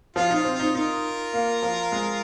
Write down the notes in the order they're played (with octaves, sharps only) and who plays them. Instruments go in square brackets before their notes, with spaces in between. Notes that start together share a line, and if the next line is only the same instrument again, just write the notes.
[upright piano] F3 [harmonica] F4
[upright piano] D#4 [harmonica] F4
[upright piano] C4
[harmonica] F4
[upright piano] D#4
[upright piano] D#4 [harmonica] F4 A#4
[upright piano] A#3
F3
G#3